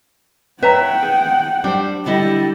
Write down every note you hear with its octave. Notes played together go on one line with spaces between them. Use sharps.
B4 C#5 E5 F#5 G5 A#5
G#4
G3 D4 C5
D3 G3 E4 D#5